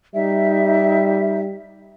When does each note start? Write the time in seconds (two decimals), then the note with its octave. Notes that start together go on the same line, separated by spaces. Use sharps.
0.14 G3 D#4 E5